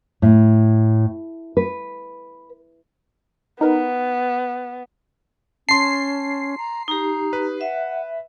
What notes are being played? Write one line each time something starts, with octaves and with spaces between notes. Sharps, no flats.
A2
B4
B3 D#4 A#4 B4
C#4 A5 C6 C7
A#5
D#4 G4 A#5
B4
E5 F#5